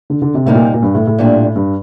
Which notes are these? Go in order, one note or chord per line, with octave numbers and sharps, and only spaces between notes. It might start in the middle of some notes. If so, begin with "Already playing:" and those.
D3
D3
C3
A2 C3 G3 A#3 D#4
A#2
A#2
G2
A2
A2
A#2 G3 D4
G2